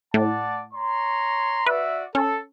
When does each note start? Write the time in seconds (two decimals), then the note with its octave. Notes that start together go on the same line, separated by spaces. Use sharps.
0.14 A2 D5 F#5 A5
0.74 C#5 A#5 C6
1.67 F#4 B4 D5 E5
2.15 C#4 A4